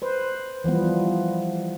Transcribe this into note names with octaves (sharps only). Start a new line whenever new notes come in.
B4 C5
E3 F3 G3 B3